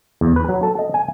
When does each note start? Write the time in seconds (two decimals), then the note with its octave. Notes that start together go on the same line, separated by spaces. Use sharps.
0.21 E2
0.36 B4
0.49 F#3
0.63 A4
0.79 D#5
0.94 G#5